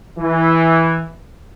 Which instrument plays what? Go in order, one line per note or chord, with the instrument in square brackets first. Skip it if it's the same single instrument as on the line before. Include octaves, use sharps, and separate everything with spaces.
[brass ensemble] E3